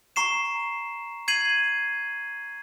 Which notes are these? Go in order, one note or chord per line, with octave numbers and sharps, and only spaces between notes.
A#5 C#6 C7 E7
G#6 C7 D#7 F#7